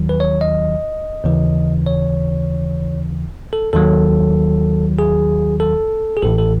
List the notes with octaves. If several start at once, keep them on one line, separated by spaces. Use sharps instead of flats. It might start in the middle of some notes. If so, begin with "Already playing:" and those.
Already playing: D#2 D#3 F#3
B4
C#5
D#5
D#2 C#3 E3
C#5
A4
D#2 D#3 F#3 A4
G#4
A4
G#4
A1 A2 E3 A4
A4